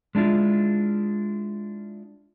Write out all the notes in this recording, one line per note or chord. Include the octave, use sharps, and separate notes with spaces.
G#3 D4 E4 F4